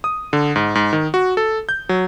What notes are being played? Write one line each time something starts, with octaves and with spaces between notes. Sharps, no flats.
D#6
D3
G#2
G#2
D#3
F#4
A4
G6
F#3